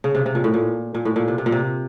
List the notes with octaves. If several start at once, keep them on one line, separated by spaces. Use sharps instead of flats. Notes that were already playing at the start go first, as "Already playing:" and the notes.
C#3
C3
C3
A#2
A2
A#2
A#2
A2
A#2
C3
C3
A#2
C3